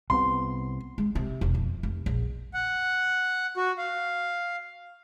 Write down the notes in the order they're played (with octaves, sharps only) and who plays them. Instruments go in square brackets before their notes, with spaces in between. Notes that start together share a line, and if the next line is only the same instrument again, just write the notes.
[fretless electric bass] C2 C3 B3 [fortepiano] C6
[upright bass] G#3
C3
E1
F2
F1
A#1
[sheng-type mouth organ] F#5
F#4
F5